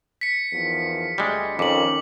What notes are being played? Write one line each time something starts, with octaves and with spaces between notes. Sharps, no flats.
B6 C#7
E2 D#3 F3
D2 G3 G#3
F2 D#3 C#4 D6 F#7